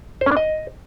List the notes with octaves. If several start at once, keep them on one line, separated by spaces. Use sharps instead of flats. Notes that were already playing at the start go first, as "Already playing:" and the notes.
C5
C#4
D4
D#5